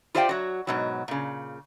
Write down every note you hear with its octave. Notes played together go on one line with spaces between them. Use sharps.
F4 G4 C5 D5 F5 G5
F#3 F#4
G#2 B2 F#3
A#2 C#3